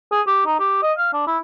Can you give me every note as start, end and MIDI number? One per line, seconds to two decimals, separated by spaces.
0.12 0.22 68
0.27 0.41 67
0.46 0.58 63
0.59 0.81 67
0.82 0.93 75
0.98 1.13 77
1.13 1.27 62
1.27 1.38 64